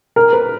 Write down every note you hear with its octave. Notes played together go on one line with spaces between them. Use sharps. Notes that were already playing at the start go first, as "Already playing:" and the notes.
A#4
B4